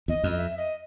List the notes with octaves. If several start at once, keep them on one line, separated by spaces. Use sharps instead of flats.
E2 D#5
F2
D#5
E5
D#5